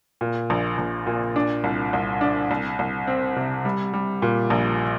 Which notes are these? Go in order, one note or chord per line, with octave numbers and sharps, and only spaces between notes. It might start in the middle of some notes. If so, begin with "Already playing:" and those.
A#2
A#1
A#1
A#2
D4
C2
C2
D4
C2
C2
C4
C3
G3
G3
A#2
A#1